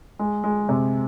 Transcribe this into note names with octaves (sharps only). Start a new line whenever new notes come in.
G#3
G#3
C3